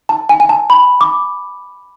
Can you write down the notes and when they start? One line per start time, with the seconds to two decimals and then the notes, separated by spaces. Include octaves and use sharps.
0.09 A5
0.29 G#5
0.40 G#5
0.49 A5
0.70 B5
1.01 D6